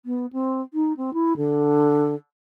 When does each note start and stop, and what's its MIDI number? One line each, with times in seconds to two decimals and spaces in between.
0.05 0.26 59
0.32 0.61 60
0.73 0.92 63
0.97 1.13 60
1.13 1.33 64
1.37 2.15 50